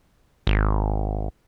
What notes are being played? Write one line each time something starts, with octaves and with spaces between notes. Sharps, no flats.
G#1